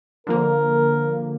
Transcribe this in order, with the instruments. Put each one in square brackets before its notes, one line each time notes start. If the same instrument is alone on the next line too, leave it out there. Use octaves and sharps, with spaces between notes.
[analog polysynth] D3 F3 A#3 [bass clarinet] A#4